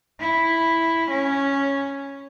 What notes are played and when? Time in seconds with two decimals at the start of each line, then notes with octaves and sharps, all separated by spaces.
0.20 E4
1.10 C#4